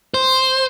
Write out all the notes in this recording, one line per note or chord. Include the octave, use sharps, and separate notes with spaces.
C5